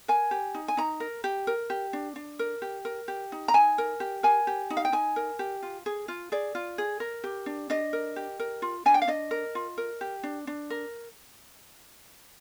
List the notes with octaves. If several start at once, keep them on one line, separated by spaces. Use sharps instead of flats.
A#4 G#5
G4
D#4
G#5
D#4 A#5
A#4
G4
A#4
G4
D4
D4
A#4
G4
A#4
G4
D#4
A#5
D#4 G#5
A#4
G4
A#4 G#5
G4
D#4
F5
G5
D#4 G#5
A#4
G4
F4
G#4
F4
G#4 D5
F4
G#4
A#4
G4
D4
D4 D#5
A#4
G4
A#4
F4
D4 G#5
G5
F5
D4 D#5
A#4
F4
A#4
G4
D4
D4
A#4